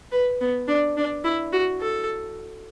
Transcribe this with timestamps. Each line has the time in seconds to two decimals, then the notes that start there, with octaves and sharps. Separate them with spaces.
0.12 B4
0.41 B3
0.68 D4
0.97 D4
1.24 E4
1.53 F#4
1.81 A4